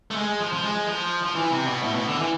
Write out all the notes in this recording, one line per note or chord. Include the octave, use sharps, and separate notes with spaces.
A3
G#3
F3
F3
G#3
F3
F3
E3
C3
B2
A2
B2
D3
E3